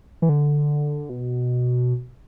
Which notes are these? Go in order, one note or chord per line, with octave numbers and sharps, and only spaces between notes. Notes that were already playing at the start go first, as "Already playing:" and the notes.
E3
D3
B2